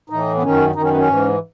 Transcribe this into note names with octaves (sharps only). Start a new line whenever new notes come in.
A2 E3 D#4
B3
F#2 D#3 C#4
F#2 D#3 D#4
C#4
B3
C#4
G#2 E3